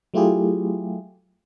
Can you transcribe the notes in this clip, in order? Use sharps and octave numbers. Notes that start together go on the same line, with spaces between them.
F#3 A3 E4 F4 G4 G#4